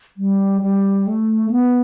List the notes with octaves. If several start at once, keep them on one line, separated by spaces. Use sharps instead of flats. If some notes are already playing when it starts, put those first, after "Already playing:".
G3
G3
A3
B3